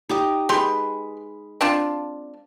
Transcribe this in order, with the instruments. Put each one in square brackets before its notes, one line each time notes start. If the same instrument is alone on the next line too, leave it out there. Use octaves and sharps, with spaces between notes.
[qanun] D#4 G4 D#5
[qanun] G#3 B4 [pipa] G4 C6
[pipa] C4 D4 F4